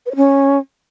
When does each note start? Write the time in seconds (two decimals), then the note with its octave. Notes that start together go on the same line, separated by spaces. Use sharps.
0.06 B4
0.11 C#5
0.16 C#4